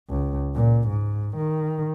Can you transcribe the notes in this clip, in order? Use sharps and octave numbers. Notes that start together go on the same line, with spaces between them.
C#2
A#2
G#2
D#3